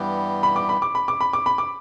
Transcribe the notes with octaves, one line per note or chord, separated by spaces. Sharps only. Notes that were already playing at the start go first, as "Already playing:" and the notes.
Already playing: G2 E3 G3 B3 G4
B5
D6
B5
D6
B5
D6
B5
D6
B5
D6